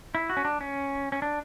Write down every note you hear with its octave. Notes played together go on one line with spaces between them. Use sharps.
E4
F#4
C#4
D4
C#4
C#4
D4